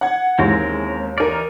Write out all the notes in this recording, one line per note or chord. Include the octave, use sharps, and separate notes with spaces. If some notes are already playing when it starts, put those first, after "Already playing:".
F#5 G#6
D#2 E3 G#3 C4 C#4 A#4
E3 D#4 A#4 D5 F6